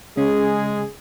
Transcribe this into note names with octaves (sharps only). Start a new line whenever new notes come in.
C#3 G#3 G#4